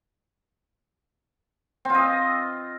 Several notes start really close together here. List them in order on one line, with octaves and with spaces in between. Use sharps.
C4 F4 D#5